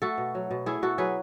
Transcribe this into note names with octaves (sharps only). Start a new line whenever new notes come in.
A3 F#4 A4
B2
F#3
B2
A3 E4 G#4
B2 F#4 A4
F#3 G#4 B4